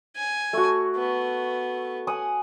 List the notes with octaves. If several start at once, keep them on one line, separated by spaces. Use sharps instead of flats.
G#5
A3 F#4
B3
F#5 G#5 D#6